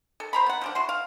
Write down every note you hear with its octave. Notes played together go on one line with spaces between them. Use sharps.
A4
C5 A#5 B5
B3 F#5
F3 G3 D4
E4 F#4 C6
F5